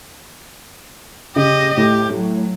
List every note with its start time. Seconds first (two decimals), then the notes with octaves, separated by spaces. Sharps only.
1.36 C#3 G4 D#5
1.77 A2 G4
2.14 F#3